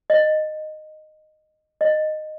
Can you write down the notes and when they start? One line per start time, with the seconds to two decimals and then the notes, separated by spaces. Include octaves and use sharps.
0.10 D#5
1.81 D#5